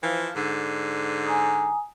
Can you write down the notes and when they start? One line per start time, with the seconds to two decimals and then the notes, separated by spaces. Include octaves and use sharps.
0.03 E3 F3
0.35 G#2 D3
1.26 G#5 A#5 D#6